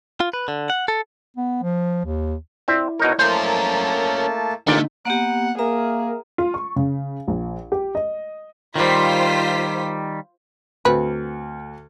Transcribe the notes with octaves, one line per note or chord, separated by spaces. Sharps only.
F4
B4
D3
F#5
A4
B3
F3
D#2
C4 E4 D5 E5
B2 D#4 A#4 C#5
A3 A#3 C#4 A#4 C5 A5
A1 A#2 D3 A3 D#4 D5
A#3 B3 G4 F#5
A#3 G#4 A#4 E5 A#5
F4
C#6
C#3
A#1
G4
D#5
D#3 G3 F4 C5 B6
D2 C4 B4